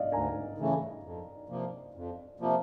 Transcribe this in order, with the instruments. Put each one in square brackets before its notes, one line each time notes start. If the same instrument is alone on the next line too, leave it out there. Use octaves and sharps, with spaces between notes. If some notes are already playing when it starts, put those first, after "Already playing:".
Already playing: [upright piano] D5 D#5 F5
[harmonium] D2 [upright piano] G#5 A#5
[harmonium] C#3 E3 A3
F2
C3 F3 A#3
F2
C3 F3 A#3